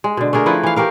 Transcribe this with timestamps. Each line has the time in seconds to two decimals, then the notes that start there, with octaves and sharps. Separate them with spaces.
0.04 G#3
0.17 B2 D3
0.33 A3 D4 G#4 A#4
0.46 F3 D#4 E4 B4
0.63 E3 F5
0.76 A3 G4 A#4 F5